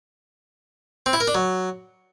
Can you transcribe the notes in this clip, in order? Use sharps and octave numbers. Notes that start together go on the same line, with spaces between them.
C4
E4
A#4
D4
F#3